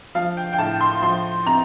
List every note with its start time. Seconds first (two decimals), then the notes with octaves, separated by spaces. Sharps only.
0.15 F3 F5
0.37 G5
0.53 G5
0.58 A2 A5
0.81 C6
1.02 F3 C6
1.46 C3 A#5